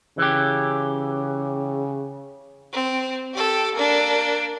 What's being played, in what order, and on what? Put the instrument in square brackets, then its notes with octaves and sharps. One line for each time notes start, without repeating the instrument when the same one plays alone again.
[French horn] C#3 [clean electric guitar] E3 G4
[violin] C4
G4 A4
A#3 D4